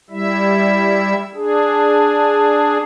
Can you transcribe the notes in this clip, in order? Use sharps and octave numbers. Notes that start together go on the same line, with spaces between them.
G3 E4 E5
D4 G#4